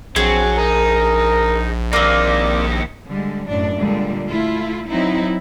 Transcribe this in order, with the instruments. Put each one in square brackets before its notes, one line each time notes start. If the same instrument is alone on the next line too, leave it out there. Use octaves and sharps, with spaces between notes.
[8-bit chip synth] A#1 [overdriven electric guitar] F#3 [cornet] C4 [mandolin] G#4
[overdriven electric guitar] D#4 [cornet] A#4
[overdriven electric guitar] D#2 D#4 [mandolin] A#3 C4 [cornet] D5
[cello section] D3 G3 G#3
F#2 A2 D4
A#2 D3 G3 G#3
A3 E4 F4
F#3 C4 D#4 E4